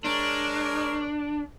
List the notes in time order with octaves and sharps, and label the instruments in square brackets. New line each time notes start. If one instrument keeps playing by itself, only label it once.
[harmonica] G#3 A#4 C#5 [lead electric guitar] D4